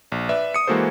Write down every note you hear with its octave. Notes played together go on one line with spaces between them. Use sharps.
A#1
B4 D5 E5
D#6 C#7
E3 G#3 A#3 F#4 A4 C5